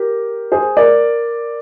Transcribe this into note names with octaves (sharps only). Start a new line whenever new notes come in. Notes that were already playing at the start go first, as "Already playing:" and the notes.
Already playing: G4 A#4
G#4 C5
A#4 D5